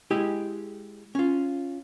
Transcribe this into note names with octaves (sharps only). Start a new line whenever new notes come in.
G#3 E4 G4 G#4 D#5
C#4 F4